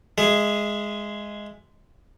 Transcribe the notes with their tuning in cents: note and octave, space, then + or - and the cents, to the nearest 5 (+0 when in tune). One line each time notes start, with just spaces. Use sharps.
G#3 +0 G#4 +0 E5 +20